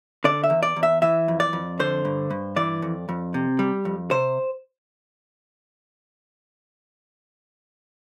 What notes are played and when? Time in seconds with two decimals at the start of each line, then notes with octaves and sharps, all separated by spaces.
0.24 D3 D5
0.44 E5
0.50 E2
0.63 D5
0.76 E2
0.83 E5
1.02 E3 E5
1.28 F2
1.40 D5
1.53 F2
1.79 D3 C5
2.05 G2
2.30 G2
2.56 E3 D5
2.82 F2
3.09 F2
3.34 C3
3.59 G3
3.85 F2
4.11 C3 C5